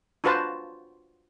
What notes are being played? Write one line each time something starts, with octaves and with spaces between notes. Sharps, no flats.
D4 F4 F#4 B4 C5 A5